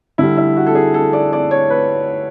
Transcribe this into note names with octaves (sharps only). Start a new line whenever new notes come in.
D3 G3 E4
E4
F#4
A4
G#4
A4
D5
D5
C#5
B4